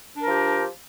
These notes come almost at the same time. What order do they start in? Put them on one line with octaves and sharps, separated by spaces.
D4 A#4 F3 G4